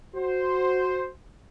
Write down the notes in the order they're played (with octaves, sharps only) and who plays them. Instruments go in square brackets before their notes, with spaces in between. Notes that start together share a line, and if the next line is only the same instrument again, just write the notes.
[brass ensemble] F#4 C5